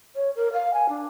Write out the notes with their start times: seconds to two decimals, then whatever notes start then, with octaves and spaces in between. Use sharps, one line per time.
0.16 C#5
0.36 A#4
0.53 F5
0.74 G#5
0.89 D4